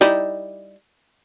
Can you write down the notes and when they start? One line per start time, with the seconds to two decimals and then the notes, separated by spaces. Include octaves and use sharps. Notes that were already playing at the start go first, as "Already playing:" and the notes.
0.01 G3 D#4 E4